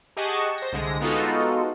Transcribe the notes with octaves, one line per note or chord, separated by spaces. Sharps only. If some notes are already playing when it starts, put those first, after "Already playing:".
G4 G#4 D#5 F#5 A5 C#6
C5 A#6
C2 D3 G#3 A#6
G#3 B3 D#4 F4 F#4 A4